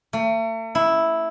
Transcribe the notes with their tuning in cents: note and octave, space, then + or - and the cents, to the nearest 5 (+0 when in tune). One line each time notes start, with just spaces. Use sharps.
A3 +40
E4 -5